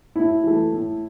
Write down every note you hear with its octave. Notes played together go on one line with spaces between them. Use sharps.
A2 E4
E3 A3
A2